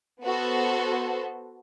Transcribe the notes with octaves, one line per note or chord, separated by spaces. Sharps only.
B3 F#4 A4 C5